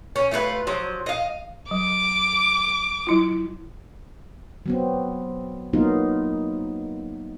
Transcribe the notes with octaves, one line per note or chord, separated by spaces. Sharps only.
C#4
A3 F4 G4 B4
F3 F#3
D#5 F5
F#3 D6
F#3 E4 F4
F#3 B3 C4
F#3 A#3 B3 D#4 F4